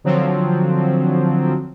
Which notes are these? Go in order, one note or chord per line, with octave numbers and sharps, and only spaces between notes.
D3 F3 F#3 C4